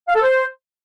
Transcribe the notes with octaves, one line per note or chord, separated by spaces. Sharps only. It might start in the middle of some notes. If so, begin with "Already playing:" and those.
F5
A4
C5